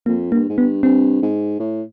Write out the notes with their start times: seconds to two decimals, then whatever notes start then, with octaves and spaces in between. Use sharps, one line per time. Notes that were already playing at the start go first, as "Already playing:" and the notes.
0.06 F2 A#3
0.32 G2 A#3
0.49 G#2
0.58 G2 B3
0.83 G2 C4
1.22 G#2
1.60 A2